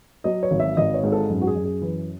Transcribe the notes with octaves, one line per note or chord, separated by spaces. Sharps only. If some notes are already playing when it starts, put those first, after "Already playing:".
F#3 D#5
C#5
G#1
E5
G#1 D#5
C#5
G#2
A4
F#2
F#4
G#4
F#2
G#4
E3